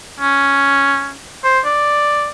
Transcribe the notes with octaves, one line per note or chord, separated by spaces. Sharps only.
C#4
C5
D5